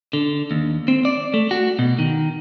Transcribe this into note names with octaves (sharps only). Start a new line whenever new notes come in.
D3
D#2
C4
D5
A3
F#4
B2
D#3